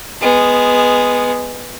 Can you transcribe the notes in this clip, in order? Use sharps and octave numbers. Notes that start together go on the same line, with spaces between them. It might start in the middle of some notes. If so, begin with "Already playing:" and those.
G#3 B3